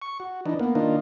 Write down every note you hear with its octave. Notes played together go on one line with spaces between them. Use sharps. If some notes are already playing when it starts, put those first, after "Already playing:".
C#6
F#4
E3 D4 D#4
A#3 B3
D#3 A#3 D4 D#4 F4